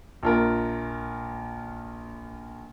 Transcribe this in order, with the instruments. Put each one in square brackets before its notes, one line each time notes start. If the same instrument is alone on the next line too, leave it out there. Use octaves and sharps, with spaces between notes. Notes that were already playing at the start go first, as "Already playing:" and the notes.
[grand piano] A#1 F4 A#4